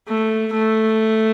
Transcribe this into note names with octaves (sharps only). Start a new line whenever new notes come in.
A3
A3